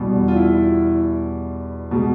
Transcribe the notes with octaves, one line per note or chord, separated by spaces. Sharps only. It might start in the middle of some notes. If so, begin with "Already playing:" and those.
Already playing: E2 B2 G3
F4
E4
B2 G#3